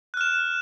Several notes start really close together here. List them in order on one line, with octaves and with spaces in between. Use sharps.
F#6 F6 E7